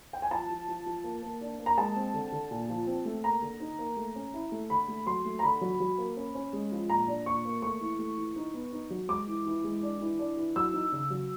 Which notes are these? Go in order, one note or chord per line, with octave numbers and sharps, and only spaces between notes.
G5
G#5
F3 A5
F3
F3
F3
A#3
A#3
D4
A#3
A#5
G#3 A5
C4
D3
D3
A#2
F3
C4
A3
A#3 A#5
D3
D#4
A#3
A3
C#4
E4
A3
D3 B5
A3
F#3 C6
A3
A#5
D3 B5
F#3
F#3
A#3
C#4
C#4
G#3
F3
A#2 A#5
D4
A#2 C#6
A#3
A3 C#6
E3
A3
E3
D#4
B3
D#4
F#3
G#3 D6
E3
E3
G#3
D4
E3
D4
E3
F#3 E6
D#4
C#3
F#3